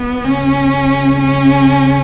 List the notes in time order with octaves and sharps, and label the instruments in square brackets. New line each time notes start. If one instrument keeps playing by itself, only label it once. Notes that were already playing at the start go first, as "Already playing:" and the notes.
Already playing: [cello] B3
[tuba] C#3 [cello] C#4
[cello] C#4